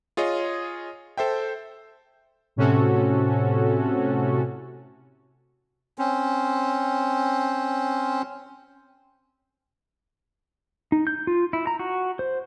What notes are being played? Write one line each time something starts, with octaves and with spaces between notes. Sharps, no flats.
F4 G#4 C#5 D#5
A4 C5 E5 G5
A2 C3 C#4 F#4 A4
C4 C#4
D#4
G6
F4
E4
A#5
F#4
C5